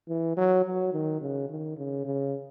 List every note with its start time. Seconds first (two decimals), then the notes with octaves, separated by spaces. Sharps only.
0.09 E3
0.37 F#3
0.65 F#3
0.93 D#3
1.21 C#3
1.50 D#3
1.77 C#3
2.05 C#3